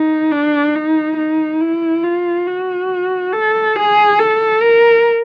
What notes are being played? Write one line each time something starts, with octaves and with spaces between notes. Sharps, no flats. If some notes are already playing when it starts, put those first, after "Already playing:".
Already playing: D#4
D4
D#4
D#4
E4
F4
F#4
A4
G#4
A4
A#4